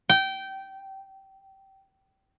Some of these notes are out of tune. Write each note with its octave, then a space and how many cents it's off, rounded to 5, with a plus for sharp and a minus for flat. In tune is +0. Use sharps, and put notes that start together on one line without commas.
G5 -20